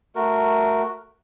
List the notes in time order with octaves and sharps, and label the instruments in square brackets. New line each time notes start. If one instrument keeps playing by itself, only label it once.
[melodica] A3 F#4 A#4